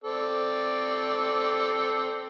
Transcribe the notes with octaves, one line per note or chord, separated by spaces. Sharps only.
C4 A4 D5